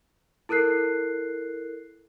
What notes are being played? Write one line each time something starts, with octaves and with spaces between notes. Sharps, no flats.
E4 A4 A#4 F#6 C7